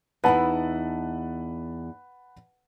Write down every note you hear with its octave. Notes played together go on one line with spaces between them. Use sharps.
E2 D#4 E4 B4 F#5 A5